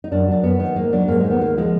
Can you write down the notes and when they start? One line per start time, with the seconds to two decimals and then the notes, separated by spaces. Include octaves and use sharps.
0.04 D#4
0.11 F#2 D4
0.28 F#3 D4
0.43 F#2 B3
0.59 D#3 B3
0.76 G#2 A#3
0.93 F#3 D4
1.08 G#2 A#3
1.20 D#3 G#3
1.30 B3
1.41 D2 A#3
1.57 F3 G#3